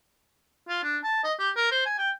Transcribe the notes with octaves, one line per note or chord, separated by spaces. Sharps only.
F4
D4
A5
D#5
G4
A#4
C5
G#5
G5